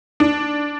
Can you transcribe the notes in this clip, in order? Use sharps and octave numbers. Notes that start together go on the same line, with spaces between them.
D4